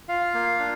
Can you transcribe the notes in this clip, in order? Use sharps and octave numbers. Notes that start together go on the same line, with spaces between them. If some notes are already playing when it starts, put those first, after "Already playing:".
F4 F5
A#3
D4